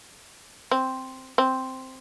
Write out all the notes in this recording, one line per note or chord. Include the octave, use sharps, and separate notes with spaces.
C4
C4